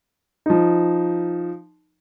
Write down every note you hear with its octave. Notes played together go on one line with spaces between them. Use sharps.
F3 D#4